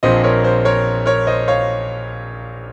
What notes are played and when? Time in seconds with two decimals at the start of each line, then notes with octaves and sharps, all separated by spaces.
0.03 A#1 A#2 F3 C4 C5 D#5
0.24 A#4 C#5
0.44 C5
0.65 A#4 C#5
1.06 A#4 C#5
1.27 C5 D#5
1.48 C#5 F5